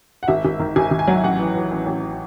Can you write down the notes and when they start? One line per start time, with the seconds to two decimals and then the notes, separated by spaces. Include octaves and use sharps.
0.23 F#5
0.28 G#1 E5
0.45 G#1
0.59 D#3
0.76 G#1 G#5
0.91 G#1
0.99 G#5
1.08 F#3 F#5
1.16 E5
1.23 A1 F#5
1.39 E3
1.55 E3
1.72 A1
1.86 A1